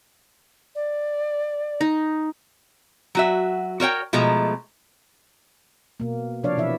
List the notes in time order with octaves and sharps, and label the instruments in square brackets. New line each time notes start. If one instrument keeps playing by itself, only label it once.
[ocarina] D5
[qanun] D#4
[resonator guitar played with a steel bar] F#3 F#4 E5
F#4 A#4 C#5 G5
B2 F3 G#3 A3 A#5
[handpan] B2 A#3
C3 F3 D4 C#5 D5 F5
B2 E3 E4 E5